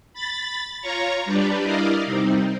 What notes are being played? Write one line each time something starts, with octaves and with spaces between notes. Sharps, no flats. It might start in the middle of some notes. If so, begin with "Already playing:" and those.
B5 A6
F4 C#5 A#5 C#6
G3 D4 G4 B4 D5
E4 A#4 D5 D#5 F5
C3 G3 C4 D#4